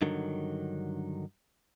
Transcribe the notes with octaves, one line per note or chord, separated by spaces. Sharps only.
G2 D3 D#3 F#3